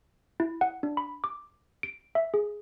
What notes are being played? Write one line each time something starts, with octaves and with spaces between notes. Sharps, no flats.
E4
F#5
D4
B5
D6
D7
E5
G#4